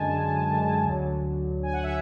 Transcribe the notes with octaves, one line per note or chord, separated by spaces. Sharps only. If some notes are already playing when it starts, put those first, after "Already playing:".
Already playing: F#2 D3 G#3 G#5 A5
D2 D3 F#3
G#5
F#5
E5